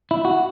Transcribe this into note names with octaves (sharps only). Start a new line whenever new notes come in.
E4
F#4